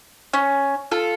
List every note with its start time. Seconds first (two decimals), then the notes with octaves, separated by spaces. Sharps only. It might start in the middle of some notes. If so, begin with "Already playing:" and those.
0.33 C#4
0.91 F4 A4